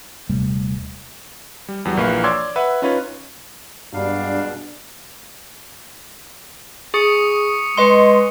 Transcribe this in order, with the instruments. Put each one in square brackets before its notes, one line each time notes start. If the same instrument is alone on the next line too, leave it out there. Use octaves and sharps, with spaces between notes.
[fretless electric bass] D#1 C3 G3 A3
[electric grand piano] G3
E2 F#3 G3
A#1 E3 A#3 B4 F5 C#6
C#5 D5 C6 D6 E6 G#6
B4 E5 F#5
C#4 D#4 F4 B4 C#5
[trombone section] G2 [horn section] B2 G#3 D4 [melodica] G3 F5
[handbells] G#4 [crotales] C#6 D#6 C#7
[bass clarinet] G#3 [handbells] B4 D#5 C6